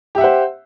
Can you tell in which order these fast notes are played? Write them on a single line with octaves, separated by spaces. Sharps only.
G4 E5 F#5 C5